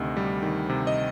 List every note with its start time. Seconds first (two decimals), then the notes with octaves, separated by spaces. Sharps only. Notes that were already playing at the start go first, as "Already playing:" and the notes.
Already playing: D2 C3 D#3 D#5
0.17 G3
0.43 D#3
0.70 C3
0.87 D#5